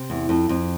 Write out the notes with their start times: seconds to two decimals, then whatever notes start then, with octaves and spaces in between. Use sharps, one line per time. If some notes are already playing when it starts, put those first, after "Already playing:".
Already playing: C3
0.10 E2
0.29 F2
0.49 F2